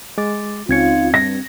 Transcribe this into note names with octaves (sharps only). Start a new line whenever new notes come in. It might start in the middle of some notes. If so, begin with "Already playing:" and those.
G#3 D6 A6
C#2 C4 C#4 D#4 F4 G#6 C#7
G2 A#6